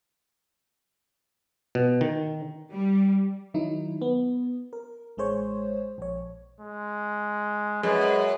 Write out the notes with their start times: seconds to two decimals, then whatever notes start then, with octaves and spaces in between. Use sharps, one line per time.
1.75 B2
2.01 D#3
2.72 G3
3.54 D#3 F#3 D#4 E4
4.02 B3
4.73 A#4
5.17 A1 G#3 G#4 C5 C#5
5.98 A#1 C#5
6.60 G#3
7.83 F#2 G#3 B4